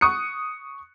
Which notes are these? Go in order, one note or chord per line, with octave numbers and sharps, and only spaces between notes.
C#6 D#6 F#6 C#7